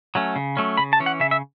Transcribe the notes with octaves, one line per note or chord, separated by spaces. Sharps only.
F#3 A3 C#4
C#3
F#3 A3 C#4
C#3 B5
A5
E3 C#4
F#5
C#3 E5
E5